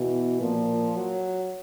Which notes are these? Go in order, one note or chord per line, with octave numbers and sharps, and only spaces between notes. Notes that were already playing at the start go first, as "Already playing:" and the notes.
Already playing: B2 E3
A#2 F3
F#3